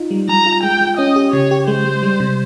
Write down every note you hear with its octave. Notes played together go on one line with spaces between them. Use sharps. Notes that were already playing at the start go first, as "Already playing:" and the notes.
Already playing: D#4 F4
G3
G3 A#5
F4
G#3 G5
G#3
C#4 D#5
G4
C#3 C#5
G4
G#3 C5
G#3
G3
C3